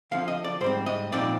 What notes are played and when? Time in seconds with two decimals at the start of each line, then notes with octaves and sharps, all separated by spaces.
0.11 D3 F3 C4 F5
0.28 D#5
0.44 D5
0.61 G#2 C5
0.64 G3 C4
0.86 D#5
1.12 A#2 F3 C4 D#4 D5